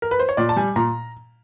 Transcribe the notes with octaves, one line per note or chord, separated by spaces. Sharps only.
A#4
B4
C5
C#5
A#2 D5
A5
G3 G#5
A#2 A#5